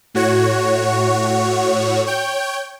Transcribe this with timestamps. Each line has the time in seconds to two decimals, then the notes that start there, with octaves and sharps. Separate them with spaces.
0.14 A2 F#4 C#5
2.07 C#5 G5 G6